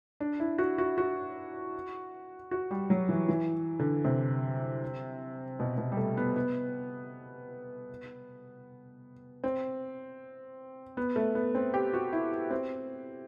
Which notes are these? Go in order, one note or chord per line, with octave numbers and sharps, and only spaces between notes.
D4
E4
F#4
F#4
F#4
F#4
G3
F#3
E3
E3
D3
C3
B2
B2
G3
A3
B3
B3
C4
B3
A3
B3
C4
G4
F#4
E4
C4